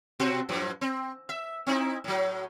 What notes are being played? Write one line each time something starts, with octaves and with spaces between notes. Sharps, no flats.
B2 C4 F#4
F#2 A2 F3
C4
E5
C4 D#4 E4
A2 F#3